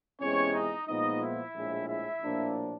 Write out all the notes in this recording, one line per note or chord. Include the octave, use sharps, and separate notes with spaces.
E2 C3 E3 G#3 C#4 C#5
D#4 D#5
A#2 F3 G#3 B3 D#4 D#5
E4 E5
A#1 A2 F3 G#3
E4 E5
A#1 A2 F3 A#3 D4